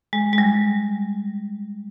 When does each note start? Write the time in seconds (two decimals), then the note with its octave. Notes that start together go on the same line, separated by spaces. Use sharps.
0.13 G#3
0.33 G#3
0.38 G3